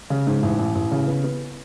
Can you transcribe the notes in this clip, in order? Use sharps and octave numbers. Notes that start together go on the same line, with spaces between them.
C#3
G#2
A1
A1
A1
C#3
B3
B3